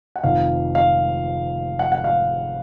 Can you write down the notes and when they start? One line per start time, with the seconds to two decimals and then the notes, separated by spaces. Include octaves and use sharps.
0.16 F#5
0.23 F1 F2 D#3 F5
0.75 F5
1.79 F#5
1.92 F#5
2.04 F5